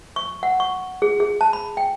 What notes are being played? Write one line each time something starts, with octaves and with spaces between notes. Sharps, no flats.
C#6
F#5
C#6
G#4
G#4
A5
B5
G5